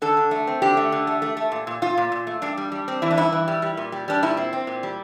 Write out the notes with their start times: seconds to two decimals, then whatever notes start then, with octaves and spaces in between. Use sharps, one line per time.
0.02 D3 A4
0.17 D3
0.31 A3
0.47 C4
0.62 D3 G4
0.77 A3
0.92 D3
1.07 A3
1.22 A3
1.37 A3
1.52 A#2
1.67 A#2
1.82 A#2 F4
1.97 A#2
2.12 A#2
2.27 A3
2.42 G2 D4
2.58 G3
2.72 G3
2.88 C4
3.02 E3 E4
3.11 D4
3.17 G2 E4
3.32 E3
3.48 G3
3.62 G3
3.77 A#2
3.92 G3
4.08 G3 D4
4.23 A#2 E4
4.37 C4
4.53 C4
4.67 A#2
4.83 G3